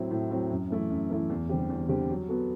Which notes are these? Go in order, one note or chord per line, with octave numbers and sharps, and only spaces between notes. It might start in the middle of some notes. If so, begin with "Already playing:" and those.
Already playing: A2 F#3 C4 E4
A2
F#3 C4 E4
F#2
E3 A3 E4
F#2
E3 A3 E4
E2
D3 G3 C4 G4
E2
D3 G3 C4 G4
F#3
B3 F#4 A4